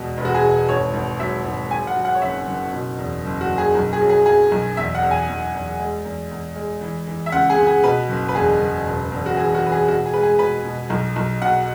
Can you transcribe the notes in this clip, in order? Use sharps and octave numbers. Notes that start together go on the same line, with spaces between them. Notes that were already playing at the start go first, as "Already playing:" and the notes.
Already playing: E2 B2 G#3
E1
F#4
G#4
E1
G#1 C#5
G#1
F#3 E5
G#1
F#3 G#5
F#5
F#3
F#5
C#5
F#1 E5
F#1
B2
E2
F#1
F#4
F#1
G#4
B1
G#4
F#3
G#4
F#3 G#4
B1
E2 E5
F#5
E2
G#5
E2
E2
G#3
E2
E2
G#3
E3
E3
E5
C#2 F#5
G#4
C#2
G#4
B2 B4
F#1
B4
E2 G#4
F#1
E1
E2
F#4
E3 G#4
F#4
E3 B4
G#4
B2 F#4
G#4
G#3 B4
G#4
B2 B4
B2
B1
B1
B2 F#5